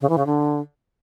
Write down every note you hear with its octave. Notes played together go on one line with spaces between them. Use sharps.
C#3
E3
C#3
D3